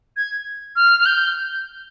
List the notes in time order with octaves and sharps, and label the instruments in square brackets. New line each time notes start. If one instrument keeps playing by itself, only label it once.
[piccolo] G#6
F6
F6
G6